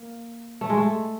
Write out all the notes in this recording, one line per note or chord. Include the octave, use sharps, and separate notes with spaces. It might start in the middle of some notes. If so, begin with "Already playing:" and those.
Already playing: A#3
A3
G#3
A3